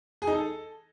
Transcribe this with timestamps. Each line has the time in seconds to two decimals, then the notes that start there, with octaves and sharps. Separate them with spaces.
0.22 G#4
0.27 D#4
0.33 A4